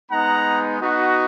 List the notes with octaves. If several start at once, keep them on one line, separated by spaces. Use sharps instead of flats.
G#3 B3 D#4 F#5 A#5
B3 D#4 F#4